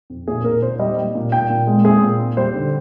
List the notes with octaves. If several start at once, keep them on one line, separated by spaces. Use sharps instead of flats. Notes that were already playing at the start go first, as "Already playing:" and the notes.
F2
A#2 G#4
A#2 A#4
A#2 C5
G3 D#5
G3
A#2
A#2 G5
A#2
G#3
C4 G#4
A#2
C4
G3 C5
D3